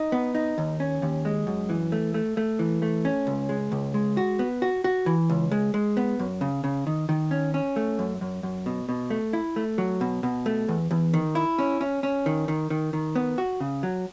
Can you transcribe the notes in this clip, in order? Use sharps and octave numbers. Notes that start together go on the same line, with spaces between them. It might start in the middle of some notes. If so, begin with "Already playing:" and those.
Already playing: D#4
B3
D#4
D#2
C#4
D#2
G#3
F#2
E3
A3
A3
A3
E3
A3
C#4
C#2
G#3
C#2
G#3
F#4
B3
F#4
F#4
E3
C#2
G#3
G#3
B3
F#2
C#3
C#3
D#3
D#3
C#4
C#4
A3
F#2
F#2
F#2
B2
B2
A3
E4
A3
F#3
B2
B2
A3
E2
E2
D#3
E4
C#4
C#4
C#4
D#3
D#3
D#3
D#3
B3
F#4
C#3
F#3